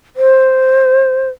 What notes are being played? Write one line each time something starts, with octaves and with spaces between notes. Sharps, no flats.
C5